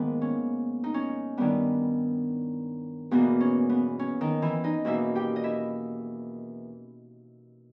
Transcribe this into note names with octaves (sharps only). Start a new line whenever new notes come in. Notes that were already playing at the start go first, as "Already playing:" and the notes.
Already playing: G#2 D#3 A#3 B3
C#4
D#4
C#4
G2 D#3 G3 B3
E2 B2 A#3 B3
C#4
B3
C#4
D#3 D#4
E3 E4
D#4 D#5
E2 B2 A#3 E4 E5
G4 G5
D#5
E4 E5